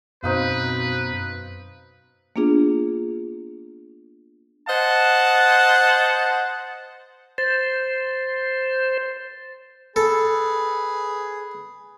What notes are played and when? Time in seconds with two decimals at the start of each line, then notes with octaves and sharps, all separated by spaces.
0.24 F#2 B2 C4 D#4 B4 F5
2.36 A#3 B3 D4 F4 G#4
4.69 C5 D#5 F#5 A5
7.38 C5 A6
9.96 G#4 A4 B4